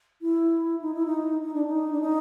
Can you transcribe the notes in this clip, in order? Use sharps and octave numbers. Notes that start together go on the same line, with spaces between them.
E4
D#4
E4
D#4
D#4
D4
D#4
D4
D#4